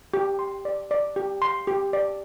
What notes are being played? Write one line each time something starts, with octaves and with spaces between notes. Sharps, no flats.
G4
C6
D5
D5
G4
C6
G4
D5